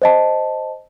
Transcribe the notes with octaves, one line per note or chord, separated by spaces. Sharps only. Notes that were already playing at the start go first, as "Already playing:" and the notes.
C5 D#5 A5